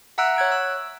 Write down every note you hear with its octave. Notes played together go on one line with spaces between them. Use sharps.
E5 F#5 A#5 E6 F#6 D7
C#5 F#6 G#6 D7
E6